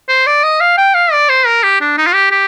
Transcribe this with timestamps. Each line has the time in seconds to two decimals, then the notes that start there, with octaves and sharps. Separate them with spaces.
0.09 C5
0.27 D5
0.44 D#5
0.61 F5
0.78 G5
0.94 F5
1.12 D5
1.29 C5
1.46 A#4
1.63 G4
1.81 D4
1.98 D#4
2.07 F4
2.14 G4
2.31 G4